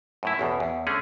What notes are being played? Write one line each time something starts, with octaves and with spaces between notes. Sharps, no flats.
F#2 A2 E4
A1 E2 B2
E2
D3 A3 C#4 G#4